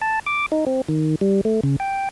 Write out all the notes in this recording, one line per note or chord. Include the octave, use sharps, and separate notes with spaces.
A5
D6
D#4
C4
D#3
G3
A3
C#3
G5